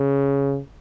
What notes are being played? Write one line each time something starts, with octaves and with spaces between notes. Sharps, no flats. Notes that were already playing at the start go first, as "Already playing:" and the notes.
Already playing: C#3